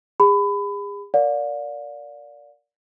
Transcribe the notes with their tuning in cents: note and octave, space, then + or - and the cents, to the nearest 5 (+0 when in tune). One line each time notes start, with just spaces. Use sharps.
G#4 -40 B5 +25
A#4 +0 D5 -20 F5 +45